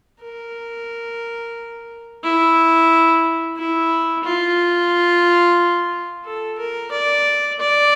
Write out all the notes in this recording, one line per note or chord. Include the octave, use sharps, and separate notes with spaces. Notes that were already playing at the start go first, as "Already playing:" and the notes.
A#4
E4
E4
F4
A4
A#4
D5
D5